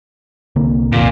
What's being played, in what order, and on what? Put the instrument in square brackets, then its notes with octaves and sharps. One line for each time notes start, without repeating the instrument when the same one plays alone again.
[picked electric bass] C2 D3 A#3
[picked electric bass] C2 F2 [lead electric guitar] A#2